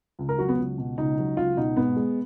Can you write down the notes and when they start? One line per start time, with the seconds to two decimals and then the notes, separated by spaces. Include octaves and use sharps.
0.19 C#2
0.29 A#4
0.39 F#3 F#4
0.49 B3
0.58 C#2
0.78 B2
0.98 C#2 D#4
1.18 F#3
1.37 C#2 F4
1.57 B2 D#4
1.77 G#2 B3
1.97 G#3